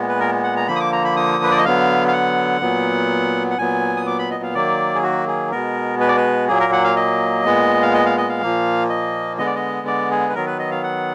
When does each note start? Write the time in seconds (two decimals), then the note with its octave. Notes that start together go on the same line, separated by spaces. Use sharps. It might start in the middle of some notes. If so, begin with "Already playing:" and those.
Already playing: A#2 G#3 B3
0.09 B4
0.20 A#4
0.44 F#5
0.56 A#5
0.68 D3 F3 A#3 B5
0.76 D#6
0.80 D6
0.93 A#5
1.05 B5
1.16 D#6
1.44 B4
1.51 D5
1.58 D#5
1.65 D3 F#3 B3 F5
2.08 F5
2.13 F#5
2.61 A#2 F#3 B3
3.50 F#5
3.58 A#2 F#3 B3 G#5
3.97 D#6
4.07 D6
4.19 B5
4.31 D#5
4.43 F5
4.54 D#3 F#3 A#3 D5
4.95 G#4
5.03 F#4
5.28 G#4
5.51 B2 G#3 B3 A#4
6.00 B4
6.08 D5
6.17 B4
6.48 A#2 F#3 A#3 G#4
6.60 A#4
6.72 F#5
6.84 F5
6.96 D#5
7.45 A#2 G#3 B3
7.82 F5
7.94 D#5
8.05 F5
8.18 D#5
8.29 F5
8.42 A#2 F3 A#3
8.90 D#5
9.38 D3 G#3 B3 D#5
9.47 D5
9.55 D#5
9.87 D5
10.11 G#4
10.29 B4
10.35 D#3 F#3 B3 A#4
10.47 B4
10.59 D#5
10.71 F5
10.83 F#5